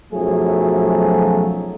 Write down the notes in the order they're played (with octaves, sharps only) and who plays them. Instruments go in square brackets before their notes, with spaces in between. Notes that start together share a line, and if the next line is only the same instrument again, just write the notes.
[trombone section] B1 F#2 F3 F#3 A3 G#4